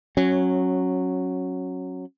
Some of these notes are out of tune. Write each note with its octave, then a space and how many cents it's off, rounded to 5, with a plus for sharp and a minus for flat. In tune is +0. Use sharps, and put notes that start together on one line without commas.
F#3 -5 C#4 -20